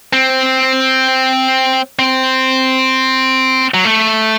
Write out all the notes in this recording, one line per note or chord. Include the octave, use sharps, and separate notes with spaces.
C4
C4
F#3
A3